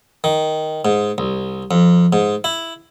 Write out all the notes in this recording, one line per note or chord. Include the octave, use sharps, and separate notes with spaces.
D#3
G#2
C2
F2
G#2
E4